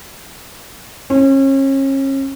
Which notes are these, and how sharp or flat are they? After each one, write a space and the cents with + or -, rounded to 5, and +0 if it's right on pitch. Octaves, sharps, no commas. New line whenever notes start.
C#4 -35